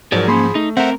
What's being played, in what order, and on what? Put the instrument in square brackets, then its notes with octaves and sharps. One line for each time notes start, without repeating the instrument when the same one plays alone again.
[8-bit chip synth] G#2 F3 [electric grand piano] F#3 A#4 [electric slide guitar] G#4 D5
[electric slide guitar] A#3 C#4 [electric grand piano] G#4 B5 C6
[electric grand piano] A3 [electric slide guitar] D#4
[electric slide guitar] C4 A#4 [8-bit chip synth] C5 E5 F#5